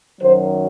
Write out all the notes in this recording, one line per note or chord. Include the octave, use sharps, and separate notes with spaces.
F#2 D#3 F#3 C5